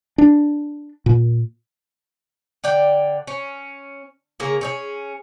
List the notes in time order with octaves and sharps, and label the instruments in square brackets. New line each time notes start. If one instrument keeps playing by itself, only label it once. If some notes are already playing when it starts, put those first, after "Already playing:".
[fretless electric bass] D4
A#2
[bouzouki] D3 D5 G5
C#4
C#3 A#3 G#4
C#4 D#4 G#4